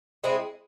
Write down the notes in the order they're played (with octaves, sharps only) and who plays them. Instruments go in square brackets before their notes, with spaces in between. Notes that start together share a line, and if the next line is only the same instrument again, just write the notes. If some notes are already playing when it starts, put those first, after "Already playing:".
[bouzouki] G#3 C4 E4 G#4